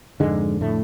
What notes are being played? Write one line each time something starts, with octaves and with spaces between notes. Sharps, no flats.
F2 G#2 D3 G#3
A2 A3